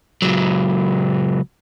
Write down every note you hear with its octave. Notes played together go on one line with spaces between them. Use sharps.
C#2 F#3